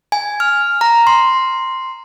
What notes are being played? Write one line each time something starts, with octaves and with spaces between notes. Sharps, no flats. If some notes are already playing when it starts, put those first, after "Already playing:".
G#5
F6
A#5
C6